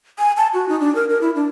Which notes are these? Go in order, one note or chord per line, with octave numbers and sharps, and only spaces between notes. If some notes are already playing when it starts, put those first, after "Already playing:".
G#5
A5
F#4
D#4
D4
A#4
A#4
E4
D4